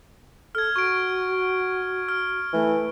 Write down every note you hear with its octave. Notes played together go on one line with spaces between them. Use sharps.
A4 F6 G#6
F#4 C#6 D7
F6
E3 A3